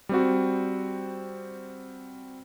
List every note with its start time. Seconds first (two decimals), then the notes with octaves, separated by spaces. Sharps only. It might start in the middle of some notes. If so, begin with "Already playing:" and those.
0.09 G3 C4 F#4